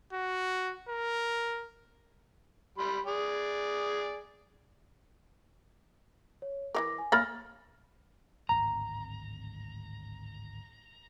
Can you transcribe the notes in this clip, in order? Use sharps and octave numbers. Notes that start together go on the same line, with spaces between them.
F#4
A#4
G3 B5 C6
G#4 D5
C#5
E3 G3 A#4 D6 A#6
G#5
A#3 C#5 B5 F6 A6 A#6
D1 G#1 A#5